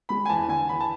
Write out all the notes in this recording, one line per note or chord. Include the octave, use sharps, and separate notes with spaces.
G#3 B5
G#5
E2 A5
D3 G#5
E2 B5
A5